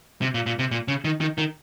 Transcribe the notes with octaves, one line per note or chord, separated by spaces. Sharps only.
C3
A#2
A#2
C3
A#2
C#3
D#3
D#3
D#3